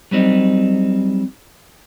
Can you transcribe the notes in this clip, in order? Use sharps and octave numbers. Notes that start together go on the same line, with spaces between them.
F#3 G3 C4 D#4